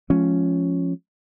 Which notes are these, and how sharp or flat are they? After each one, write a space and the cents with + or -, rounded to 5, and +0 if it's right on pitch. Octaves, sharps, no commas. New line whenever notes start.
F3 +0 G#3 +35 C#4 +0